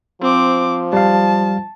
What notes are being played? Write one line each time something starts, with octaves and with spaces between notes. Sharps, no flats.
F3 C4 D6
G3 F5 A5